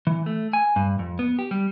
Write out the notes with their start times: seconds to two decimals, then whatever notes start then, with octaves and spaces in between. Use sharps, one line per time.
0.07 E3
0.26 A3
0.53 G#5
0.76 G2
0.99 F2
1.19 B3
1.39 G4
1.51 G3